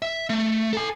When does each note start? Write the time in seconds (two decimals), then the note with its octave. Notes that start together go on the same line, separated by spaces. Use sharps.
0.02 E5
0.30 A3
0.73 A4 G#5